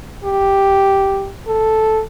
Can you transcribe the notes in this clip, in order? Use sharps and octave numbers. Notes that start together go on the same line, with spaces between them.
G4
A4